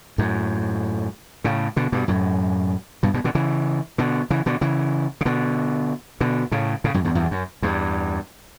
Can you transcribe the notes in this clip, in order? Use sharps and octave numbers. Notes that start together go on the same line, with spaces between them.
F#2 A2
A2 C#3
B2 D3
G2 B2
F#2 A2
G2 B2
G2 B2
B2 D3
C#3 E3
B2 D3
C#3 E3
B2 D3
C#3 E3
C#3
B2 D3
B2 D3
A2 C#3
A2 C#3
F#2 A2
E2 G2
E2 G2
F#2
E2 G2